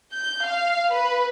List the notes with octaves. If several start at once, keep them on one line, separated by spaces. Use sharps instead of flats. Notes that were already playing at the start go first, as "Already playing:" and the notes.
G6
F5
B4